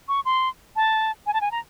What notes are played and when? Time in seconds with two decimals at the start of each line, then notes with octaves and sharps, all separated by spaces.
0.08 C#6
0.25 C6
0.76 A5
1.27 G#5
1.33 A5
1.41 G#5
1.51 A#5